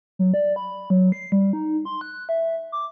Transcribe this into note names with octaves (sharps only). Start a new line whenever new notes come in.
F#3
D5
B5
F#3
C7
G3
D#4
C6
F#6
E5
D6